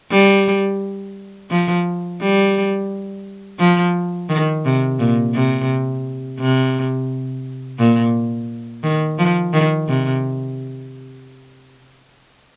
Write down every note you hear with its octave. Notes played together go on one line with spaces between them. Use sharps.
G3
F3
G3
F3
D#3
C3
A#2
C3
C3
A#2
D#3
F3
D#3
C3